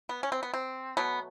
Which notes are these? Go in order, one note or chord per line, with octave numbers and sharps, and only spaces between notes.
B3
C#4
C4
B3
C4
B2 F#3 A3 B3